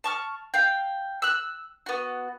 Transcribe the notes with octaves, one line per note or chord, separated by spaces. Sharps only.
A5 C#6 F6
F5 G5
E6 F#6
B3 F#4